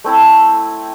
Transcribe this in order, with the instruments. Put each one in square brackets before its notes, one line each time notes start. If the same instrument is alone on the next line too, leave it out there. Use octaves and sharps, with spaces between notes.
[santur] A3 C4 E4